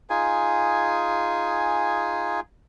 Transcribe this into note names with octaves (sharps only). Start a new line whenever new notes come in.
D#4 F4 G#4 G#5